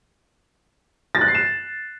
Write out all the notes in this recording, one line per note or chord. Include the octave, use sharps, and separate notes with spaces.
A6
F#6
C7
E7